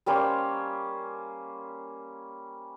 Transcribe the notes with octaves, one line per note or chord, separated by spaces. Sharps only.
G3 A#3 C#4 C5